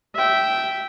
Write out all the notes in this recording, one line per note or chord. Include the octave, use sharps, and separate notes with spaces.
E5 G5